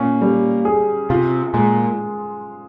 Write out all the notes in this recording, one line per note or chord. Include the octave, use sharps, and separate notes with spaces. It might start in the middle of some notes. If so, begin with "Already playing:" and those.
Already playing: A#2 C#4
G3
G#4
C3 F4
A#2 G#3